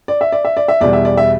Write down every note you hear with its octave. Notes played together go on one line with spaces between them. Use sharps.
D5
E5
D5
E5
D5
E5
E2 B2 G3 D5
E5
D5
E5